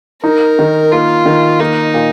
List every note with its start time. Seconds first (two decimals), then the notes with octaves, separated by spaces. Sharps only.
0.24 D#4 A#4
0.59 D#3
0.92 A#3 F4
1.26 D#3
1.60 A#3 D#4
1.94 A#2